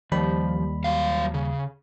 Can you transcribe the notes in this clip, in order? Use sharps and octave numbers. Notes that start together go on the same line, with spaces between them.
D#2 F3 G3 B5
F#3 F5
C#3